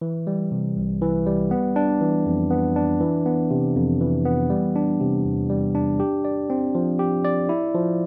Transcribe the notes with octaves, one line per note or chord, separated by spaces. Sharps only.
E3
G3
C3
C2
E3
G3
B3
D4
E3
F2
B3
D4
E3
B3
C3
F2
E3
B3
G3
D4
C3
E2
G3
D4
G4
D5
C4
F3
G4
D5
E4
F3